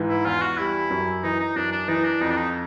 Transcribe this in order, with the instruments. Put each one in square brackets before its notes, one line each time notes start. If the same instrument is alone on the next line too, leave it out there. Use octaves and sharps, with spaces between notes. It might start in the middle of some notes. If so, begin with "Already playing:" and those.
Already playing: [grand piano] G#2 E3
[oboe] E4
[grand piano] E2 [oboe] F4
[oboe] F#4
[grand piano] G3 [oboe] E4
[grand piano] F#2
[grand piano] E3 [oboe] D#4
[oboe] D#4
[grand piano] F#2 [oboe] D4
[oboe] D4
[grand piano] E3 [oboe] D#4
[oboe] D4
[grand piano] F2 [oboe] D#4
[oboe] D4
D#4